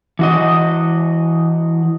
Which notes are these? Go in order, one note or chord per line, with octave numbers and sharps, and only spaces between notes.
E3 F#4 D#5